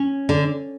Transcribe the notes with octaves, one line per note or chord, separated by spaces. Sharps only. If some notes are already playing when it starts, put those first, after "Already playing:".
Already playing: C#4
D3